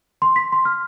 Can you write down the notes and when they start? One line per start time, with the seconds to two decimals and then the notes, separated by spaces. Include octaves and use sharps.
0.22 C6
0.36 B6
0.52 C6
0.65 F6